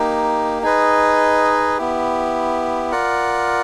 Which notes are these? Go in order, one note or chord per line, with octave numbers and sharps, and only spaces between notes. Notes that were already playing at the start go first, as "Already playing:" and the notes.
Already playing: A#3 D#4 G4
D#4 G#4 B4 D#5
B3 E4 G4
F4 A#4 D5 F#5